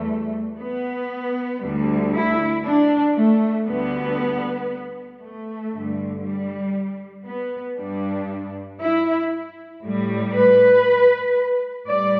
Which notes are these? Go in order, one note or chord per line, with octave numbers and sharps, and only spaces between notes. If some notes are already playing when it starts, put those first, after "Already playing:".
Already playing: E2 E3 G3 A3
B3
D2 D3 G3
E4
D4
A3
D2 D3 G3 B3
A3
G2 D3 G3
G3
B3
G2 G3 D4
E4
A2 G3
B4
A2 G3 D5